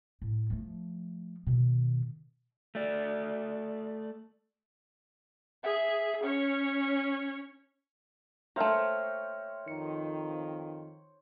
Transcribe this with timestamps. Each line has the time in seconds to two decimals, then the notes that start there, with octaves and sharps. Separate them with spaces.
0.22 A2
0.50 F3 A3
1.47 B2 D#3
2.75 A3 D5
5.63 G#4 E5
6.23 C#4 C#5
8.56 A3 A#3 C5 C#5 E5 G5 F6
9.68 F2 D#3 C#7